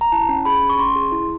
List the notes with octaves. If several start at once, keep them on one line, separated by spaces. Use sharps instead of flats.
A#5
E4 A5
C#4
G#4 B5
C#4
C#6
C#4 C6
G#4
E4